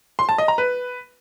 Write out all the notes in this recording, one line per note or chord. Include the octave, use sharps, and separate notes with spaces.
C6
A5
D#5
A#5
B4